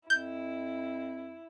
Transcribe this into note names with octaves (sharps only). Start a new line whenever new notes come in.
F2 E4 G6